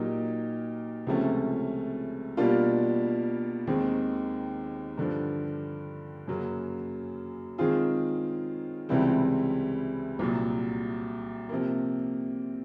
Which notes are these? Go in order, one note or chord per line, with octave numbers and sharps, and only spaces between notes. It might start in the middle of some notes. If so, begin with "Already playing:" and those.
Already playing: A#2 F#3 A#3 D#4 G4
C#2 C3 F3 A3 C#4
B2 G3 A#3 D4 F4
D#2 D#3 G#3 C4
G2 D3 F3
F#2 C#3 F#3 A#3
D#3 G#3 C4 F4 G#4
C#2 C3 E3 G3 C4
C2 A#2 F#3
C3 F3 A#3